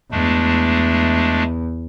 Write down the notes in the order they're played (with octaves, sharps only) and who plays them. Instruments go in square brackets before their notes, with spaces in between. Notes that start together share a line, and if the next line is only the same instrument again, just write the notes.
[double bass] E2 [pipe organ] G#3 A3 D4